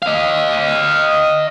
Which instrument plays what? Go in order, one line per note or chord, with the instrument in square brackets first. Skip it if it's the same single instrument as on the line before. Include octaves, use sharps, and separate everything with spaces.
[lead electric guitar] D#5 F5